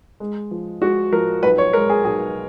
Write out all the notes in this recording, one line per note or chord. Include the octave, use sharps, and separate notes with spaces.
G#3
F3
G#3 F#4
F3 A#4
B1 B4
C#5
G#3 A#4
G#4
B1 G#4